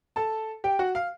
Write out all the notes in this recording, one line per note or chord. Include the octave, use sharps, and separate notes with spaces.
A4 A5
G4 G5
F#4 F#5
F5